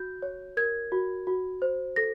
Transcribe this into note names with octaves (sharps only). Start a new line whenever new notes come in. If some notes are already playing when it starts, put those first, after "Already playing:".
Already playing: F#4 G6
C#5
A#4 G#6
F#4
F#4
C5
A4 A#6